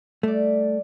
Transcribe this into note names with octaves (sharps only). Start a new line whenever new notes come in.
G3 A3 D5